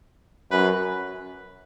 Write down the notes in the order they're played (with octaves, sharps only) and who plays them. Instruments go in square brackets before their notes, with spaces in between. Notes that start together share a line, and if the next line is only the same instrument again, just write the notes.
[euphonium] F#2 [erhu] B4